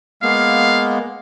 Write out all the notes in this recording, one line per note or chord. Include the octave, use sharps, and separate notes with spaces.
G#3 A#3 B3 F5